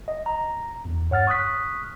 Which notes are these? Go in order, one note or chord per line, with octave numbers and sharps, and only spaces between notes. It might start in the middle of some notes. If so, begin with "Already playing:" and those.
D#5
A#5
E2
G2 C#5 F#5 F6 A6
C#6 D#6 F6 F#6 B6